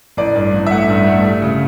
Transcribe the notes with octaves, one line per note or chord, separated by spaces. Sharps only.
A1 D5
G2
A1
E5
A3 F#5
G2
A3
G3
C#3